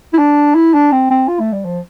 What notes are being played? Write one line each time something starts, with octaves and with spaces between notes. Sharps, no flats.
E4
D4
E4
D4
C4
C4
F4
A3
G3
F3